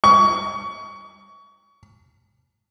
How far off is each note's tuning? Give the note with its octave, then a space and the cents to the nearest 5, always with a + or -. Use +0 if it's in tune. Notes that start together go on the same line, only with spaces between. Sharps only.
C#6 +25